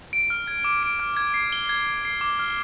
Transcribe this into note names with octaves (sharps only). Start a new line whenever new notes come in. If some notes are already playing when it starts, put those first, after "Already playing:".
D7
F6
G#6
D6
D7
F6
G#6
C7
G7
G#6
G#6
C7
D6
F6